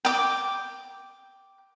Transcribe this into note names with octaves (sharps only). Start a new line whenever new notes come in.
G5 D6